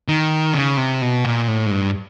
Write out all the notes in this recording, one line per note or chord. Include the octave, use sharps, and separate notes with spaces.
D#3
C#3
C3
B2
A#2
A2
G#2
G2